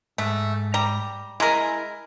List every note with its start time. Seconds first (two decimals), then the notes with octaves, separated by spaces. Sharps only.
0.18 G#2 A3
0.74 G3 A#5
1.40 G#3 E4 A#4 G#5 A#5